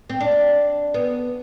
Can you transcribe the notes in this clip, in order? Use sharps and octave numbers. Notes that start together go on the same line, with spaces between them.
C4
D4
B3